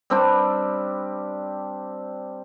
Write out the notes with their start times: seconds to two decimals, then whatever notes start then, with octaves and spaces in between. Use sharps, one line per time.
0.10 G3 C4 D4 G4